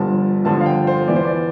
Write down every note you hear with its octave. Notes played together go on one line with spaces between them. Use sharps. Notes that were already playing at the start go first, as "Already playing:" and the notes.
Already playing: G1 G2 D3 F3 A5
G1 G2 D3 F3 A5
F5
G5
C5
E2 E3 D5
C5
D5